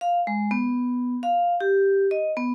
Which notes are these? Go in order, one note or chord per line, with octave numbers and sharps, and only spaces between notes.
F5
G#3
B3
F5
G4
D#5
B3